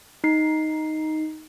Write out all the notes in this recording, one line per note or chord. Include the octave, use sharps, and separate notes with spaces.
D#4 C7